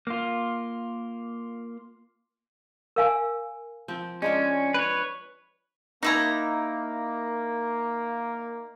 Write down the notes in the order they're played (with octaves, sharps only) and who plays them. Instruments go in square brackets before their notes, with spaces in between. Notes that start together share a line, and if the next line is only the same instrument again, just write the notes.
[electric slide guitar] A#3 F4
[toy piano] A#4 F5 G#5
[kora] F3 C4
[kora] G#3 D4 F4 [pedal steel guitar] C#4
[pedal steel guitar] B4 C#5
[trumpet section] A#3 [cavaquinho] D#4 E4 A#5